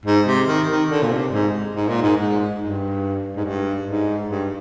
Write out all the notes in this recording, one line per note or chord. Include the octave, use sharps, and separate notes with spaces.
G#2
C3
D#3
D#3
D3
A#2
C3
G#2
G#2
A#2
G#2
G#2
G2
G#2
G2
G#2
G2